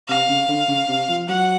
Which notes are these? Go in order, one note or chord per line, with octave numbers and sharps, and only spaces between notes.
C3 F5
C#3
D3
C#3
C3
F3
F#3 F#5